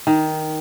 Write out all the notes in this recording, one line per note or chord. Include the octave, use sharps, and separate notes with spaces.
D#3